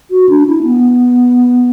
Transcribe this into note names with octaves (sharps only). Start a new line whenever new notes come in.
F#4
D4
E4
B3